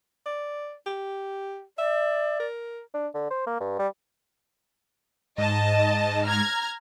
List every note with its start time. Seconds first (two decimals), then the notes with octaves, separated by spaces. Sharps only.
0.26 D5
0.87 G4
1.78 D5 E5
2.40 A#4
2.94 D4
3.14 D3
3.31 C5
3.46 A#3
3.61 G2
3.79 G3
5.38 G#2 D#5 A5
6.26 A#5 F6 G#6